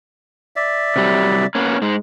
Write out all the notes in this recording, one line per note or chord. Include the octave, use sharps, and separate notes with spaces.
D5 E5
C3 F#3 G3
A#3 B3 C#4
G#2 G#3